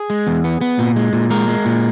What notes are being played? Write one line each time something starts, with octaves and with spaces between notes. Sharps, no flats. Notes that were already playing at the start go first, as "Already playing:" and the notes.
Already playing: G#4
G#3
E2
B3
B3
A#2
G#3
A#2
G#3 A#4
G#3
A#2